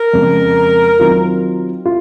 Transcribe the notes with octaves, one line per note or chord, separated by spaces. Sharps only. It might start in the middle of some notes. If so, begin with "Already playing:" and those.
Already playing: A#4
F2 C#3 G#3
D#3 F#3 C4 F4
F4